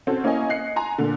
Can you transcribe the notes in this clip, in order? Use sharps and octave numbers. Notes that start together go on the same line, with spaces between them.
C4 C#4 F#4 A4 C5
A#3 C#4 E4 C#5 D#5 G#5
D#5 F#6 C7 C#7
G#5 A#5 C6
A#2 D3